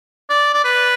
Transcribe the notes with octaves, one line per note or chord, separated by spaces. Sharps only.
D5
D5
B4